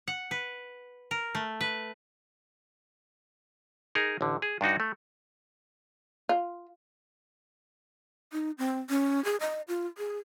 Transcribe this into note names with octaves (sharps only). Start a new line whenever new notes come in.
F#5
B4
A#4
A3
B4
D#4 G#4 A#4
A1 D3
G#4
G2 D4 D#4 F#4
A3
F4
D#4
C4
C#4
G#4
D#5
F4
G#4